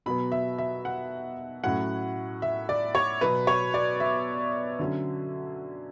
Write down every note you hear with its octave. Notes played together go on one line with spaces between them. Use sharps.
B2 F#3 B3 B5
E5
E5
F#5
A2 F#3 C#4 F#5
E5
D5
C#5
B2 F#3 B3 B4
C#5
D5
E5
D3 F#3 C#4